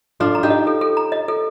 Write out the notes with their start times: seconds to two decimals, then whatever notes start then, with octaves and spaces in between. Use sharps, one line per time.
0.20 D4 F4 A4
0.35 A#5
0.43 D#4 G4
0.50 D#5
0.67 A4
0.81 A4
0.97 A#5
1.12 D#5
1.28 A4